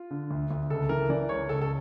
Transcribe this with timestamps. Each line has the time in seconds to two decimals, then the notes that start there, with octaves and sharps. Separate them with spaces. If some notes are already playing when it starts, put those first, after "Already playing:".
Already playing: F4
0.10 D3
0.31 D2
0.51 D2
0.70 C#2 A4
0.89 E3 A#4
1.09 E3 D5
1.29 C#2 C#5
1.49 C#2 A4
1.61 A4